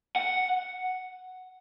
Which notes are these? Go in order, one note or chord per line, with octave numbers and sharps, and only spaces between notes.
F#5